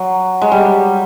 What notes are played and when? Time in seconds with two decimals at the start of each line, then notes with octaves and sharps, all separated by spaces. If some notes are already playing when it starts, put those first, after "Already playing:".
Already playing: F#3
0.42 G#3
0.52 G3